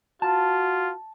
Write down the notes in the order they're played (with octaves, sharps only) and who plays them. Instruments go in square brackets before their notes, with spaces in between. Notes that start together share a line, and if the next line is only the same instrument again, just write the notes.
[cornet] F4 [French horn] F#4 [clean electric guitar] A5